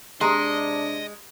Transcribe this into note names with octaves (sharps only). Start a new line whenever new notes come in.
C3 G#3 D4 G4 D#5 A#5 C6